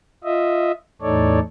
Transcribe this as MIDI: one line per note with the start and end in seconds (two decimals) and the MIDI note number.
0.24 0.72 65
0.24 0.72 75
0.24 0.72 76
1.02 1.40 40
1.02 1.40 45
1.02 1.40 63
1.02 1.40 69
1.02 1.40 73
1.02 1.40 74